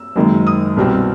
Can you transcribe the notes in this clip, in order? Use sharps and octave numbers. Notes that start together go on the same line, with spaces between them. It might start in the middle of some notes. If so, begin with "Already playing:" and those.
Already playing: E6
F#1 F#2 D#3 G#3
D#6
C2 B2 G3 C4